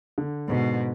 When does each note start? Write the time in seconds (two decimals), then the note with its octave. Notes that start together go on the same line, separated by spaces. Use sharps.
0.18 D3
0.49 G#2 B2